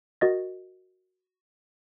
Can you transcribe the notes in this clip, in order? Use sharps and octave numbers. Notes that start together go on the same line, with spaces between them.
F#4 A#4 D#5 A6 A#6